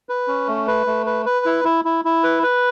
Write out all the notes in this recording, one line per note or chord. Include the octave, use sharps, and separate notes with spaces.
B4
C#4
A3
B4
A3
B4
B4
E4
E4
E4
E4
B4
B4